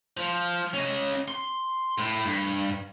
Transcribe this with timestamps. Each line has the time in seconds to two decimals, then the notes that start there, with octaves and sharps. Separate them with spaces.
0.17 F3
0.73 C#4 D#5
1.28 C6
1.98 A2
2.26 G2